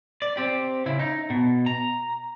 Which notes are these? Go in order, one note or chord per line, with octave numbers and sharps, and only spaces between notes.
D5
C4 G4
C#3 E4
D#4
B2
A#5